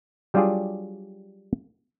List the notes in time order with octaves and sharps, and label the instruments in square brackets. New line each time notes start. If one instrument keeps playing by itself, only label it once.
[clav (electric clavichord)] F#3 G3 D4 F4 G4 G#4